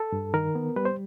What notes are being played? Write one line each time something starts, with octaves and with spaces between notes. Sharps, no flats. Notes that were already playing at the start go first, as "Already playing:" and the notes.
Already playing: A4
G2
D#3 A#4
B3
G3 B4
C5